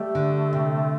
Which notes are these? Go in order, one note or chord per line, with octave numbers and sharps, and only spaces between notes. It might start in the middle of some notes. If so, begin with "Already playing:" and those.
Already playing: G3 A3
D3
C3